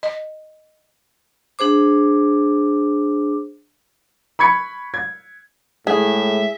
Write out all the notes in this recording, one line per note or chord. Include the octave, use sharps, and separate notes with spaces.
D#5
D4 G#4 C5 D6
B5 C#6 G#6 C#7
G#6
A2 G#3 G#4 E5